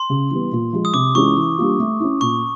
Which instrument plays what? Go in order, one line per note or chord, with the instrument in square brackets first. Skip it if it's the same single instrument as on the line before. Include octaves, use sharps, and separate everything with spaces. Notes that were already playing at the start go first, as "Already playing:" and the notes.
Already playing: [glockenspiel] C6
[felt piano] C#3
E3 G3 B3
A#2
F3 G#3
[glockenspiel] D#6
[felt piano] C3 [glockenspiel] D6
[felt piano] E3 G#3 C#4 F4 [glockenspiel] C#6
[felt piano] E3
G3 A#3 D4 F4
A3
C#4 E4
[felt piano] A#2 [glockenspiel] C#6